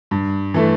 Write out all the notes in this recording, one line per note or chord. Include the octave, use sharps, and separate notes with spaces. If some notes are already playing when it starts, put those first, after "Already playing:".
G2
E3 A3